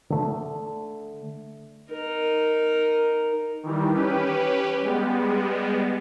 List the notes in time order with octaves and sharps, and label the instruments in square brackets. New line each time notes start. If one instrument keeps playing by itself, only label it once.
[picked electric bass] D3 A3
[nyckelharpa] D#4 A#4
[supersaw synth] D#3 E3 G3
C#4 G4 B4
G3 G#3 B3